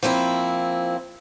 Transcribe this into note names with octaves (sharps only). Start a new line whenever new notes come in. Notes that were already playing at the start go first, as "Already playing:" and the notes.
F3 A#3 C4 E4